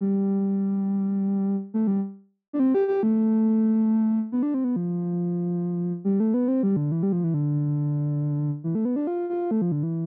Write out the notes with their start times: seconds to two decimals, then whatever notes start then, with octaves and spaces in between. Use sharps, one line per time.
0.01 G3
1.74 A3
1.87 G3
2.53 D4
2.59 C4
2.74 G4
2.88 G4
3.03 A3
4.32 B3
4.43 D4
4.54 C4
4.64 B3
4.76 F3
6.05 G3
6.20 A3
6.34 B3
6.48 C4
6.63 G3
6.76 D3
6.92 E3
7.03 G3
7.12 F3
7.24 E3
7.34 D3
8.64 E3
8.75 A3
8.85 B3
8.96 D4
9.07 F4
9.29 F4
9.51 A3
9.62 F3
9.72 D3
9.83 E3